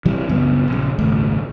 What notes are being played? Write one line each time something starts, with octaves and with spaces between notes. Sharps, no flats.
C3 E3 F#3 G3
C2 F#2 C#3 B3
A#1 C#3
D#1 G#1 C#2 A3